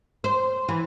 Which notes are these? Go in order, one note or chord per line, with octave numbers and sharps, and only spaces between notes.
C5
E3